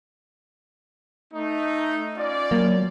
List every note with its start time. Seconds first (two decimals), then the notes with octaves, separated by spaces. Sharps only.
1.33 A3 D#4
2.15 C#4 F4 D5
2.51 F#3 A#3